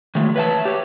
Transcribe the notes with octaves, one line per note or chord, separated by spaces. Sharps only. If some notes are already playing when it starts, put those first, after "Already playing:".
D#3 E3 F#3 G#3 A3
B4 C#5 E5 G5 A5
G4 C#5